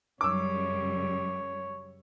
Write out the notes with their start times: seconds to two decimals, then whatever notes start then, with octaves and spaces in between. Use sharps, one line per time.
0.21 F#2 C#3 G3 C#5 D6 E6